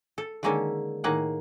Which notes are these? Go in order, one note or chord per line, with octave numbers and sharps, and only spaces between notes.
A4
D3 D#3 G#3 A#3 C#4 A4
A2 D#3 A#3 G#4 F#5